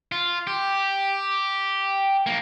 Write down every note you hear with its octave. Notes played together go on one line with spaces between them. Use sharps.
F4
G4
F3 A#3